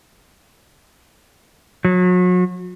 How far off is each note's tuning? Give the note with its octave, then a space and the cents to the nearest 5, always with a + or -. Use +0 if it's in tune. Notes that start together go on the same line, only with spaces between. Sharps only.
F#3 -35